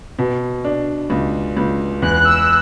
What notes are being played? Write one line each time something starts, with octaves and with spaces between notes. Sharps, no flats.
B2
D4
C#2
C#2
E2 F#6
E6